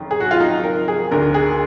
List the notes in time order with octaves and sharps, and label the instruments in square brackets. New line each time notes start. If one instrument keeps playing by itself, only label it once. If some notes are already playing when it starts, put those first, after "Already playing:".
Already playing: [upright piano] F#1 F2 D#3
G#4
F#4
F4
D#4
A#4
G#4
D2 D3 A#4
G#4